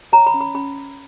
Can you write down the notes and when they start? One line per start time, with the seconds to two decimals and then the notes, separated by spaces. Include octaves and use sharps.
0.12 C#5 A#5
0.27 B5
0.34 C#4
0.41 B5
0.55 C#4 B5